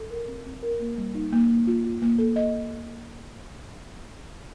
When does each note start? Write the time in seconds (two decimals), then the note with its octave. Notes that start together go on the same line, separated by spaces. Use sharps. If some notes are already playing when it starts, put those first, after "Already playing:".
Already playing: A4
0.11 A#4
0.28 C4
0.46 C4
0.63 A#4
0.80 A#3
0.97 G3
1.15 D#4
1.32 A#3
1.50 A#3
1.67 F4
1.84 F4
2.02 A#3
2.19 A4
2.36 D#5